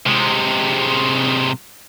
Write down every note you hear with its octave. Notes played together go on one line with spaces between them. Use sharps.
C3 G#3